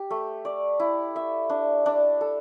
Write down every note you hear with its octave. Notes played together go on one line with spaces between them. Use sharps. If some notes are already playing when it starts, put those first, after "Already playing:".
Already playing: G4
A3
D5
E4
E5
D4
D4
A4